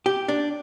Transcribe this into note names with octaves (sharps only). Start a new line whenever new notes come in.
G4
D4